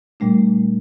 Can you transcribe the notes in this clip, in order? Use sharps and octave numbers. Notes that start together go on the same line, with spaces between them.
A#2 G3 A3 D4